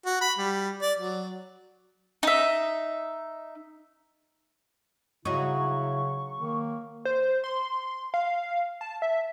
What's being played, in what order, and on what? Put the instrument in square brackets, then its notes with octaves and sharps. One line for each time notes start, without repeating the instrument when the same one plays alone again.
[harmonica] F#4
B5
G3
D5
F#3
[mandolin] D#4 E5
[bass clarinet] C#3 [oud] F#3 D#4 [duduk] E4 [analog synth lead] C#6
[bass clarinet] D#3 [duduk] A#3
[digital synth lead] C5
C6
F5
A5
E5